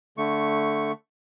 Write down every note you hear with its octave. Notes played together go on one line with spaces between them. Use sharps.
D3 A3 C#6